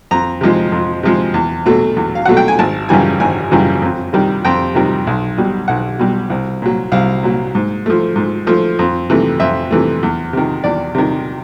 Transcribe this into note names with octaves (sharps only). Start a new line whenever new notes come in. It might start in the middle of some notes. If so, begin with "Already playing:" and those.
F2 A#5
C3 F3 G#3
F2
C3 F3 G#3
E2
B2 F#3 A3
E2
F5
B2 F#3 A3 F#5
G5
G#5
G#1 A5
F#2 C#3 E3 G3 G#5
G#1 G#5
F#2 C#3 E3 G3
F2
C3 D#3 G3
F2 G5
C3 D#3 G3
B1
B2 G3
B1 F#5
B2 G3
C2
A#2 F#3
C2 F5
A#2 F#3
G#2
F3 A3
G#2
F3 A3
F2
C3 E3 A3
F2 E5
C3 E3 A3
E2
C3 D#3
E2 D5
C3 D#3